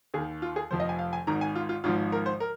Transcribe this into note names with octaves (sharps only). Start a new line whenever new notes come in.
D#2 D#3 G#4
F4
G#4
F1 F2 F3 C5
D#5
G#5
F5
G#5
G#1 G#2 D#3 A#5
G#5
F4
F4
G#1 G#2 F3 F4
A#4
C5
A#4